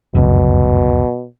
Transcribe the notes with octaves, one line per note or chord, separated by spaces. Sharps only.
F1 C#2 F#2 B2